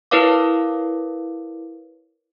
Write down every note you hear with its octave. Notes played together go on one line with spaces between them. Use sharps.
E4 A#4 B4 C#5 F5 D6